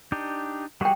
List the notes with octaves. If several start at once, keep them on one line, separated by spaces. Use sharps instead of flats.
D4 D#4 G4
G3 F#4 G#4 F#5 G5